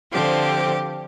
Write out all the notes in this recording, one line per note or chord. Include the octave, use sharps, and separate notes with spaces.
D3 F3 C4 G4